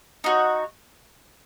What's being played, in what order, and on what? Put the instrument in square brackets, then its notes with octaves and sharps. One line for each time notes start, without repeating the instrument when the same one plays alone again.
[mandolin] D#4 F#4 C#5